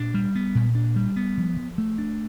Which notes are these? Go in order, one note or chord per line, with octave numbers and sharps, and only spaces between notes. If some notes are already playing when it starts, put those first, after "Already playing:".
Already playing: A#2 D4
G3
B3
A#2
D4
G3
B3
F3
F3
A3
D4